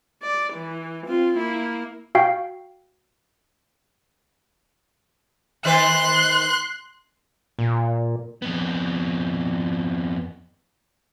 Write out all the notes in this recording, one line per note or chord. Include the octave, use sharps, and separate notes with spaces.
D5
E3
C4 F4
A#3 E4
F#4 F5 G5
D#3 B4 C5 C6 F#6
A#2
F2 B3